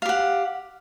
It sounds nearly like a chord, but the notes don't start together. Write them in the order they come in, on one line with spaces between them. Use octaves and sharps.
F5 G4 F#5